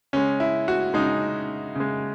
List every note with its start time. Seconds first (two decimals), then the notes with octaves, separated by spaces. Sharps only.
0.13 C#3 G#3 C#4
0.40 E4
0.68 F#4
0.94 C#3 G#3 D#4
1.75 C#3 G#3